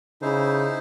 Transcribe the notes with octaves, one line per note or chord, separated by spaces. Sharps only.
C#3 D#4 E4 C5